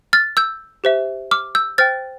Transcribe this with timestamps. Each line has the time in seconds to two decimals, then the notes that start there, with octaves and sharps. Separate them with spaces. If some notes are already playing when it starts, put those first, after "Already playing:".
0.13 F6 A6
0.37 E6 G6
0.84 G4 C5 E5
1.31 D6 F6
1.55 E6 G6
1.78 C5 G5 F6 A6